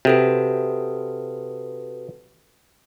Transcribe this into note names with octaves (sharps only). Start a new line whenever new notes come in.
C3 F#4 A4 B4